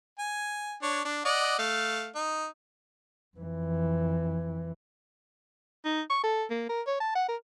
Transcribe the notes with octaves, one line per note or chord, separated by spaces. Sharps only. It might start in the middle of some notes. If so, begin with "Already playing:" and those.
G#5
D4 C#5
D4
D5 D#5 F#5
A3 F5
D#4
F2 E3
D#4
C#6
A4
A#3
A#4
C#5
A5
F#5
A#4